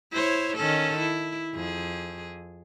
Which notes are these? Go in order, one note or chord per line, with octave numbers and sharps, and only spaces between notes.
E4 C5 C#5
D#3 C#4 A4
E4
F2 G#4